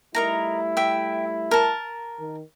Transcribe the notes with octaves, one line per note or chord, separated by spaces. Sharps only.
G3 A3 D#4 E4 A#4 A#5
E5 G5
A#4 A5
D#3